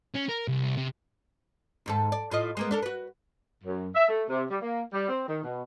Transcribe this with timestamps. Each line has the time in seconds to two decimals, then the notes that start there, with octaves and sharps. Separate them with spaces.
0.14 C#4
0.29 A#4
0.48 C2
0.77 C3
1.86 D#2 G#2 A4
2.12 D5
2.31 A2 F4 D#5
2.57 G#3 A#3 B3
2.71 D4 A4 A#4
2.82 F#4 B4
3.64 F#2
3.94 E5
4.08 A3
4.29 C3
4.49 G3
4.61 A#3
4.93 G3
5.08 C4
5.26 D#3
5.43 B2